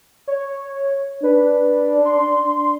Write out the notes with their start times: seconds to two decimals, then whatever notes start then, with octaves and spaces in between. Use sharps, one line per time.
0.28 C#5
1.23 D4 B4
2.05 C6